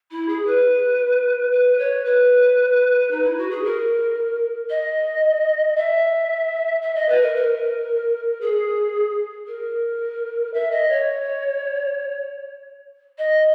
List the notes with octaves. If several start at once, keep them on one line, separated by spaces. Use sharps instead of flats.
E4
G#4
B4
B4
C#5
B4
D#4
E4
F#4
G#4
A#4
D#5
E5
E5
D#5
B4
A#4
A#4
G#4
A#4
E5
D#5
C#5
D#5